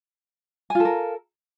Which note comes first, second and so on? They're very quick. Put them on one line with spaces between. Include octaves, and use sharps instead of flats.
G#5 F4 A4 A#4